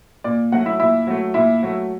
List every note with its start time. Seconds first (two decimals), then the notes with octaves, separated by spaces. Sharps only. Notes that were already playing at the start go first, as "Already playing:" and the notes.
0.24 A#2 D5
0.52 F#3 A3 F#4 F#5
0.66 E4 E5
0.80 A#2 E4 E5
1.07 F#3 A3
1.34 A#2 E4 E5
1.62 F#3 A3